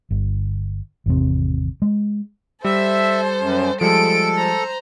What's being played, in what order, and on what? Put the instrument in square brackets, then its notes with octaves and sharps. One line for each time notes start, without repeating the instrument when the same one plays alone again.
[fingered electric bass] G1
G#1 E2 C3
G#3
[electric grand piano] G3 [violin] A4 C5 [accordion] E5
[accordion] F#2
[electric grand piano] F3 G3 G#3 [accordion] A4 [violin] D7
[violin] C5 A#5